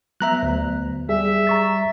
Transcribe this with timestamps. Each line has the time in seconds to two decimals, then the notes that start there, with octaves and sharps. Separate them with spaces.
0.21 F#3 B3 E5 A#5 F#6
0.43 D2
1.09 G3 G#4 E5
1.47 A#5 C#6 A6